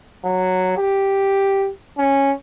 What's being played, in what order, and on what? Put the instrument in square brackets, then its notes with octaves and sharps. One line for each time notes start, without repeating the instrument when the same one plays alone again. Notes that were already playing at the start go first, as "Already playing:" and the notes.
[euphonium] F#3
G4
C#4